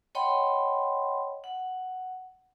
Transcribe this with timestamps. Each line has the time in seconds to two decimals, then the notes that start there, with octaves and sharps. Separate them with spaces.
0.15 C#5 D#5 F#5 G5 B5 C6
1.44 F#5